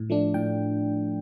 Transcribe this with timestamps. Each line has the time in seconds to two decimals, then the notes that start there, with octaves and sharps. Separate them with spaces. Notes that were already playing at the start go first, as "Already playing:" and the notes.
Already playing: A2
0.10 F3 A3 D4
0.34 A2 G5